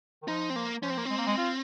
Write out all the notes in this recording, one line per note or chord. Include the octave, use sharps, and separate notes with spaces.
D#3
F3 D#4
C4
A#3
F3 C#4
C4
A#3
G#3 C4
A#3
G#3
F4